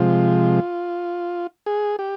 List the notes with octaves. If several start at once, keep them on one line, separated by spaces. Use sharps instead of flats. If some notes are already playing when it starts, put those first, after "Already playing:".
Already playing: C3 F3 G#3 F4
G#4
G4